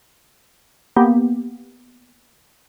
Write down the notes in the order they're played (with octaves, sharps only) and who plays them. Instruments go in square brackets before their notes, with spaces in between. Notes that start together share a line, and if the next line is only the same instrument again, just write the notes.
[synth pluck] A#3 B3 G4